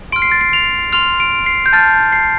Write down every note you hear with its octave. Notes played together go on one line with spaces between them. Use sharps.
C6 F6 D7
C7
A6
C7
F7
C6 F6 F7
D7
C7
G6
A5 F6 A6
C7